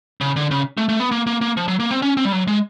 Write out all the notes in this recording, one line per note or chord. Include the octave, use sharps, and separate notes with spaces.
C#3
D3
C#3
A3
A3
B3
A#3
A#3
A#3
F3
F#3
A#3
C4
C#4
C4
G3
F#3
G#3